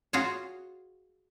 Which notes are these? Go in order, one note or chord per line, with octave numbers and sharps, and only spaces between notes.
F4 F#4 G#4 C#5